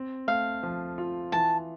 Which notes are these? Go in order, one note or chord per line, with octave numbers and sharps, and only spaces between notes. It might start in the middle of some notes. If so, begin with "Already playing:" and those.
Already playing: C4
A3 F5
F3
F4
E3 A5